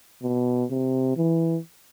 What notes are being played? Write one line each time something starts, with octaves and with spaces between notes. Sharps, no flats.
B2
C3
E3